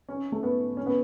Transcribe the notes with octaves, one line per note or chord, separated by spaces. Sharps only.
C#4
A3
B3
C#4
B3